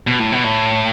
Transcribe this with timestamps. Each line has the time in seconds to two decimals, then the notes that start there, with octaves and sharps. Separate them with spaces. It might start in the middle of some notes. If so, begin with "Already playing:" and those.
0.07 B2
0.19 A2
0.32 B2
0.44 A2